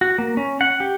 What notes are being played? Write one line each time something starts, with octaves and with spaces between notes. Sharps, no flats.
F#4
A#3
C#4
F#5
G4